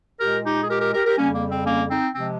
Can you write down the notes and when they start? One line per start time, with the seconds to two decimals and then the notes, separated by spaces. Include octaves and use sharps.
0.20 A#2 G#3 G4 A#4
0.44 D#4 G4
0.63 G#4
0.69 G4 A#4
0.81 G4 A#4
0.93 G4 A#4
1.05 G4 A#4
1.17 F2 C#3 G3 A#3 C#4
1.33 A#3
1.50 C4
1.66 A#3 C#4
1.90 C4 D#4
2.15 C3 F3 G#3 C4